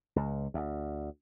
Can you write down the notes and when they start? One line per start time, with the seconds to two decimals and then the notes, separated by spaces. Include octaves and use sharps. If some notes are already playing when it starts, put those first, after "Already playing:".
0.16 C#2
0.54 D2